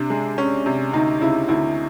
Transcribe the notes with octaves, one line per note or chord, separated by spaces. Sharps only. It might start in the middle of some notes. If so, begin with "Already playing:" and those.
Already playing: C3 D4
G#3
C#4
C3
D2 D#4
C#3 E4
D2 E4